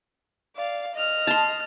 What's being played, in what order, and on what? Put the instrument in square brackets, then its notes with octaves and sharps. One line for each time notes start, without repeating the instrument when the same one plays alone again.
[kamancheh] D5 F5
D#5 F6
[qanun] A5 C6